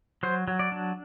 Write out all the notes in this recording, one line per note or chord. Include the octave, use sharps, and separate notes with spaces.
F#3 C5
F#3
D5
D4